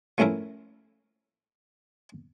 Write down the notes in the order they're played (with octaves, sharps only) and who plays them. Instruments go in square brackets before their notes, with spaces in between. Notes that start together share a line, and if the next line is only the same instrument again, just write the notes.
[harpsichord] F3 A3 C#4 E4 A#4